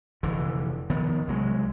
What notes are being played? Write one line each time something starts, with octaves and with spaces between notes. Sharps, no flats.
F1 D3 E3
D#3 F3 B3
C2 F#3 G#3